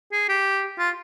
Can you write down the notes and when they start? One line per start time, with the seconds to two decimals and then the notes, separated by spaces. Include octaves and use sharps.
0.12 G#4
0.29 G4
0.78 F4